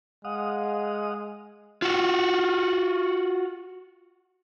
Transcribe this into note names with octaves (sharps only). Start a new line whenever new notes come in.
G#3 F5 F#5 D#6
F4 F#4